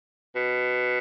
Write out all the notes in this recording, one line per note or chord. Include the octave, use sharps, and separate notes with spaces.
B2